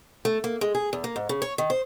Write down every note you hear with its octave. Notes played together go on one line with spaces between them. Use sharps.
A3
A#3
G#3
G#4
E2
A#3
G#2
C#3
C#5
D#3
C5